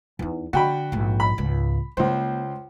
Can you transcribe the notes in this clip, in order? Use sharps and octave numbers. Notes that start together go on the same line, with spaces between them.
E2 D#4
D3 F#4 G5 B5
A#1 G#2
B5
C#2 G#2
C#2 A#3 C5